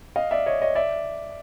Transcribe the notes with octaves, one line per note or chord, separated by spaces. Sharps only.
D#5 F5
D5 E5
C#5 D#5
C#5 D#5
D5 E5